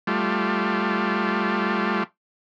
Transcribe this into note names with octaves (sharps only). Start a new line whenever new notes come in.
G3 A3 F4